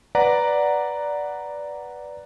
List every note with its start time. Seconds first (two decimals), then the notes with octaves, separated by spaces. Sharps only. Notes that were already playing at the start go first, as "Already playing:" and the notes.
0.15 B4 D5 F#5 A#5